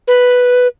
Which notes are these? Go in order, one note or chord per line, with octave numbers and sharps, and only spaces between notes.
B4